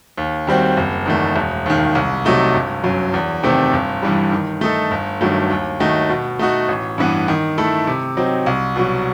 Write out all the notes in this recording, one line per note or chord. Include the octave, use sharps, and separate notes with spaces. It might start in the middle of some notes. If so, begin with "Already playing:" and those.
D#2
D#3 G3 C4 F#4
F#1
E2 D#3 A3
E1
D#2 D#3
C2
C3 F#3 A3 D#4
G1
F#2 F#3
E2
C3 D#3 A3 C4
G1
G2 E3 G3
D#3
A3 D#4 A4
G1
G2 D#3 F#3 A3
D#2
D#3 A3 D#4 F#4
B2
A3 D#4 F#4
A1
G2 E3 B3
D#3
A3 E4 A4
C3
F#3 C4 D#4
C2
B2 F#3